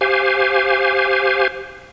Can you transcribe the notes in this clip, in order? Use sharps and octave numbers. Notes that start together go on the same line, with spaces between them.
G4 C5 F5 G#5